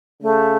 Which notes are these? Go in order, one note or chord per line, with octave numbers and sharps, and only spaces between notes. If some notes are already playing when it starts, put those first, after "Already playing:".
C#3 A3